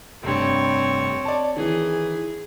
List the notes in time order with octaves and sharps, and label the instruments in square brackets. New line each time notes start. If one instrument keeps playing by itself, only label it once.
[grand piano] F1 G2 [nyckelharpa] C4 C#5
[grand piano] D5 A5
[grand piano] D#3 E3 [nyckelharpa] G#4